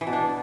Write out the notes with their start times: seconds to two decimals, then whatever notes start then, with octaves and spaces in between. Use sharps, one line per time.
0.01 E3
0.07 B2
0.13 D4